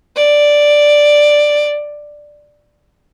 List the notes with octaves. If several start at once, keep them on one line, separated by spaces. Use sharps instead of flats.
D5